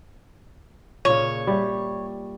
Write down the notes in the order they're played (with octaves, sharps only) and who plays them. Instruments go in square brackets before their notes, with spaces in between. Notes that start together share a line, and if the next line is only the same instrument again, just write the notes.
[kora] A#2 C#3 [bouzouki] C#5
[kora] G3 E5